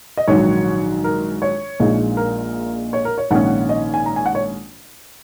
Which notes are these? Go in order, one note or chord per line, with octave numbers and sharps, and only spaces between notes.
D#5
A#1 G#2 D#3 F#3 C#5
A#4
C#5
A#1 A#2 G#3 D#4
A#4
C#5
A#4
C#5
A#1 G#2 D#3 A#3 C#4 F#5
D#5
G#5
A#5
G#5
F#5
C#5